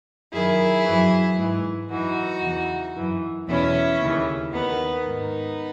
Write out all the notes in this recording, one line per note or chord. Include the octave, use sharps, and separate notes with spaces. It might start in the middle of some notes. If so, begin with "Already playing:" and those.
F#2 D#3 E4 G#4
F#2 E3
G#2 E3
F#2 E3 D#4 F#4
E2 C#3 E3
F#2 E3
E2 B2 C#4 E4
D#2 C#3 E3
D#2 D#3 B3 D#4
G#2 D#3 B3 D#4